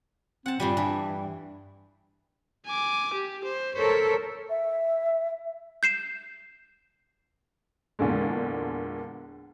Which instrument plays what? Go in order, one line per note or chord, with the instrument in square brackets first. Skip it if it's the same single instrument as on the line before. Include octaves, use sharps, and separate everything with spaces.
[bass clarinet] C4 [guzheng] F#5 A5
[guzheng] G2 E3 G3 [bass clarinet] A#2
[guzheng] E3 [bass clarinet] D4
[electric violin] G#5 D6
G4
C5
[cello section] A4 A#4 C#5 [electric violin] C5 B6
[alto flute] E5
[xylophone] G6 C7 E7
[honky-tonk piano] E2 A#2 D3 G#3